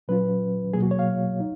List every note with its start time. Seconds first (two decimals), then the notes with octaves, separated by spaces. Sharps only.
0.08 A#2 F#3 C#4 F4 B4
0.74 B2 F#3 A#3 G#4
0.83 F#4
0.91 C#5
0.99 F5
1.40 D#4